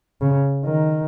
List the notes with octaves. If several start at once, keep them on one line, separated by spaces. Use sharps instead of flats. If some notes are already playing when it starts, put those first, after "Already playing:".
C#3
D#3